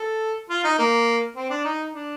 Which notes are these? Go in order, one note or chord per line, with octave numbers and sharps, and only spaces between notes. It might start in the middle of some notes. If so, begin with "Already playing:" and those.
Already playing: A4
F4
D#4
A#3
C4
D4
D#4
D4